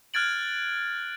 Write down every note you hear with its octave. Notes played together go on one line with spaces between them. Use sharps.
F6 F#6 G#6 A6 D7 F#7